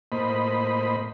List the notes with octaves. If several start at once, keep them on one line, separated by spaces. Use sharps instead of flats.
A2 A#3 C5 D#5 B5